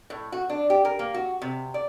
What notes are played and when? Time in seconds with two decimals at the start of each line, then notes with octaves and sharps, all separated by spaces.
0.10 A2
0.32 F#4
0.49 D4
0.70 G4
0.85 A#4
0.99 A#3
1.14 F#4
1.42 C3
1.74 D5